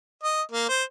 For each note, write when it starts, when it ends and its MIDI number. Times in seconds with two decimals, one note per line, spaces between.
0.23 0.42 75
0.52 0.69 58
0.69 0.83 72